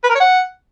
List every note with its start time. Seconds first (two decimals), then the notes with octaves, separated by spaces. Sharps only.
0.04 B4
0.10 A#4
0.15 C#5
0.21 F#5